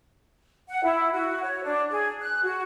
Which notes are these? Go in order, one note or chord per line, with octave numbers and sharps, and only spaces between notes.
F#5
E4
F#4
C#5
D4
G#4
F#6
F#4